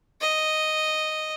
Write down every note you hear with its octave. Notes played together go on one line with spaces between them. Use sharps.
D#5